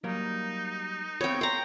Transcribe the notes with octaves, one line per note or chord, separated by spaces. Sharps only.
F#3 G3 A#3 D#4
B3 C4 C#5 F5 G5
G5 A#5 C6